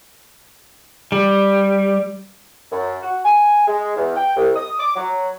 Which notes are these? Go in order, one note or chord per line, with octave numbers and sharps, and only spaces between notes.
G3
F#2
F#4
G#5
G#3
E2
G5
C2
D#6
D6
F#3